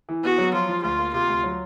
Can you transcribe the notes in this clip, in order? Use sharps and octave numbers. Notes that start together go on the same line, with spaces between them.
E3
B3 F#4
F#3
F3 F4
F3
D2 F4
A#3
C3 F4
D2
F#3